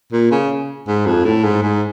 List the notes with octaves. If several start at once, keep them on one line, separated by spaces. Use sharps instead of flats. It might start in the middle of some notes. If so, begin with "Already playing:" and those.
A#2
C#3
G#2
F2
A2
G#2
G#2